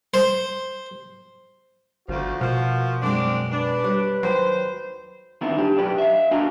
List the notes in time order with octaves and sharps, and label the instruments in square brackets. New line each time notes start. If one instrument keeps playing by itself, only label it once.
[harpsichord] C5
[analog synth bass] G1 [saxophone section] D2 F3 [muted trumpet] F#4
[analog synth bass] B2 [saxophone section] F3 [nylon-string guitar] A#3
[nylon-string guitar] F#2 G#3 [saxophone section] C4 D4
[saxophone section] D4 [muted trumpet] B4
[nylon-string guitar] G3 C5 C#5
[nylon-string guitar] D#2 G5 [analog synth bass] F#3 [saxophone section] C5
[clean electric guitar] D#3 B3 C4 D4 E4 F4
G3 D4 G4
B1 F#2 G4 B4 D5
E5 F5
D4 F#4 G#4 A#4 F5 G#5